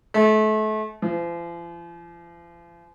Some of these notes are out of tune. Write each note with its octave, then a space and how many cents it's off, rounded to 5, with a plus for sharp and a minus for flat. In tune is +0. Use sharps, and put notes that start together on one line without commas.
A3 -35
F3 -45